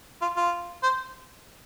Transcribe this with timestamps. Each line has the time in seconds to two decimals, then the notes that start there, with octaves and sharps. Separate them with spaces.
0.22 F4
0.37 F4
0.83 C5